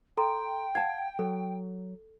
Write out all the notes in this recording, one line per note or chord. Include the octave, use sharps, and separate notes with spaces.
A4 G5 A#5 C6
F5 F#5 A5 G#6
F#3 A4